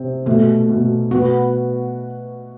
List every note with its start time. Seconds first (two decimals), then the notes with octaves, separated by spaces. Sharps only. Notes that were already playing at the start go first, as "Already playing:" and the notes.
Already playing: C3 C4
0.26 B2 A3
0.69 B2
1.11 B3 F#4